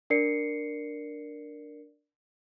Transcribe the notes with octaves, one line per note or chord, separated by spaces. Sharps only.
D4 A#4 D5 C7 C#7